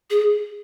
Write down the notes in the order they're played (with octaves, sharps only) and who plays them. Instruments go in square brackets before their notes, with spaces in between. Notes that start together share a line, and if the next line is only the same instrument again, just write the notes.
[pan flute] G#4